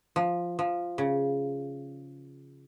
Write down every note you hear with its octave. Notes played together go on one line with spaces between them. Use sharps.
F3
F3
C#3